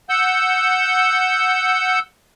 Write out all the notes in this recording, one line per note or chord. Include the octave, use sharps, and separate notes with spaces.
F#5 E6 G6